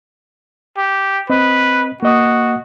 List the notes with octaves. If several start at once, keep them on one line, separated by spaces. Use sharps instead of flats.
G4
C4 B4 D#5
A#3 F#4 D#5 D#6